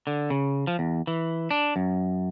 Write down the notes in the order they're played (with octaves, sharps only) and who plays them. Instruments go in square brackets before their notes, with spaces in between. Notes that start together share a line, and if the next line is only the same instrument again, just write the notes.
[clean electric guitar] D3
C#3
F3
E2
E3
D4
F#2